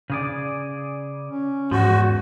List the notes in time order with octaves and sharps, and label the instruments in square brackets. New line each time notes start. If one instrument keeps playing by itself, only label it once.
[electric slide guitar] C#3 G#4 D5
[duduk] C#4
[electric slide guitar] E2 F3 [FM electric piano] G#2 [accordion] F#4